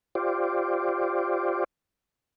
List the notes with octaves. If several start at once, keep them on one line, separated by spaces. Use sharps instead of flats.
F4 G4 C5 D5